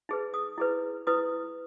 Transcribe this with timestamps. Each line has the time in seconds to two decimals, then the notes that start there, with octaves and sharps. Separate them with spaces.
0.09 D#4 G#4 B4
0.34 D#6
0.58 E4 G#4 B4
1.07 E4 B4 D#6